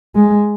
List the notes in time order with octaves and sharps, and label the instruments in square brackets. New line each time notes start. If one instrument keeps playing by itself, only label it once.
[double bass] G#3